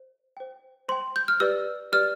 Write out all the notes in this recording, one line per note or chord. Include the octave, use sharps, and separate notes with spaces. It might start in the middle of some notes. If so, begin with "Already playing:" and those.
Already playing: C5
C5 G5
C5 G5 C6
G6
F6
G4 B4 D5 E6
G4 B4 D5 F6